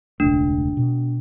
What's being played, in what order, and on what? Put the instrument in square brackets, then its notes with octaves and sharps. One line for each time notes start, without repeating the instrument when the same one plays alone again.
[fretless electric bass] E1 C#2 A3 [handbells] D4
[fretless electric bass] B2